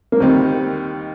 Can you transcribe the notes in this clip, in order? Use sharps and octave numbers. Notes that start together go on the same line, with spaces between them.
A#3
D#2 D#3 G3 C4